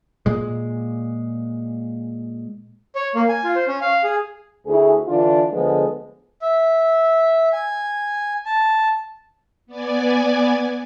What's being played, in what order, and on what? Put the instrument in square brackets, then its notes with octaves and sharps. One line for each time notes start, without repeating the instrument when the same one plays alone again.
[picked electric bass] A#2 G#3
[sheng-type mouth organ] C#5
A#3
G#5
F4
C5
C#4
F5
G#4
[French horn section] D2 E4 F#4 G#4
D3 E3 D4 F4
D2 D3 F3 G#3 B3
[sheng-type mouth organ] E5
G#5
A5
[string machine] B3 D5 G#5